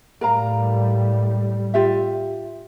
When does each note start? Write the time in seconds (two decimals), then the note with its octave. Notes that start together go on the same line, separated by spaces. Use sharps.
0.21 A2 G3 A#4 F5 A#5
1.74 F4 G4 E5